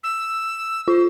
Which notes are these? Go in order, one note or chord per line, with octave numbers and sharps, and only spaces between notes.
E6
F4 C5